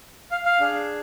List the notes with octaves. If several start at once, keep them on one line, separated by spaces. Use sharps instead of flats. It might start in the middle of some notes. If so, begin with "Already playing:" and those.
F5
F5
D4 G#4